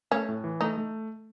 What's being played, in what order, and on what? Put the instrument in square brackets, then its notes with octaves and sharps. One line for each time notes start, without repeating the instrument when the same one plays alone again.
[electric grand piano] A3 [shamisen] C#4
[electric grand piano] A2
E3
[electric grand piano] A3 [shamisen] D#4
[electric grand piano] A3